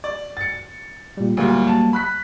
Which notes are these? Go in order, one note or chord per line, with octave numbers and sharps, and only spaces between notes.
D5
A6 C#7
A#2 G3
D2 A#2 F#3 G3 A#3
A5
B5 F#6 B6